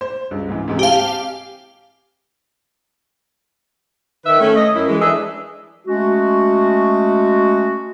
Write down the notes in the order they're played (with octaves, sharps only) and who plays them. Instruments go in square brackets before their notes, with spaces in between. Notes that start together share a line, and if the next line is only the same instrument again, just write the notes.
[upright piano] C5
C#2 G2
G#2 C#3 E3
G#2 C3 E3
[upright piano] C4 G#5 A5 [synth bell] G4 F5
[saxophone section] D#3 B4 E5
A3 C#4
D#5
F#2 E4
E3 G#3
D4 G#4 A4 B4 D#5 E5
[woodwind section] G#3 A3 C#4 F#4